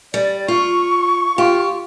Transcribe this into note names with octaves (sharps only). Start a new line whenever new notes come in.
G3 D5
F4 C#6
F4 G4